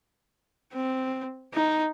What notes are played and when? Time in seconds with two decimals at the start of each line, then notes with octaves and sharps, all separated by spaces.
0.73 C4
1.54 D#4